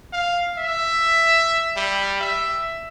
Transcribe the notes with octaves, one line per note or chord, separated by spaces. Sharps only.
F5
E5
G3
E5